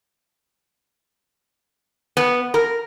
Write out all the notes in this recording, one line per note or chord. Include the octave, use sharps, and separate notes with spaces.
B3
A#4